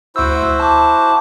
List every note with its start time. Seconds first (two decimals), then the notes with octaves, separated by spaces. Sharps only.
0.16 D2 E4 F#4 C5 E6
0.60 A5 D6